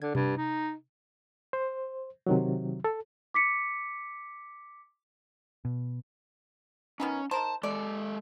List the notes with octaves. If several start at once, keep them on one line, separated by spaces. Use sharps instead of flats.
D3 G#6
G2 C3
D#4
C5
C3 D#3 F#3
A4
D6 B6 C#7
B2
D#3 B3 C#4 D#4
D#3 A#4 C5 A5
G#3 A4 D5